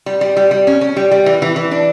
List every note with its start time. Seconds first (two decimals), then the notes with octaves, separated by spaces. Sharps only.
0.06 G3
0.21 G3
0.37 G3
0.51 G3
0.67 C#4
0.81 C#4
0.97 G3
1.11 G3
1.26 E3
1.42 E3
1.56 E3
1.71 D4